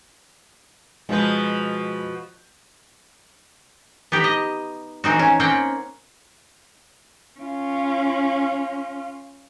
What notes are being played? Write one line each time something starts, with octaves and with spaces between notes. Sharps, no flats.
B2 F3 G#3 B4 G6
B3 D#4 G4
D#5
E3 C4 D#4 F#4
C#4
A#3 C4 C#4 C#5 F#5 G5
C#4 F4